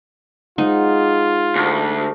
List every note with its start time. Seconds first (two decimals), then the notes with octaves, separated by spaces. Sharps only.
0.58 G#3 D#4 F4 C5 F#5
1.56 D2